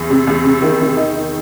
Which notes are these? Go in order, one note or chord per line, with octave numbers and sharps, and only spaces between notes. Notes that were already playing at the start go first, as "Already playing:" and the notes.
Already playing: E2
C3
E2
C3
D#3
D#3
D#4
D#4